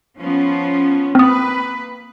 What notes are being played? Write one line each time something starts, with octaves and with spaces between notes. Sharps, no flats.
F3 B3 C#4
A#3 C4 B4 D#6